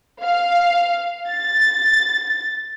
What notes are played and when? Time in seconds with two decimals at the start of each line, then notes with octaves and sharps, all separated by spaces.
0.23 F5
1.28 A6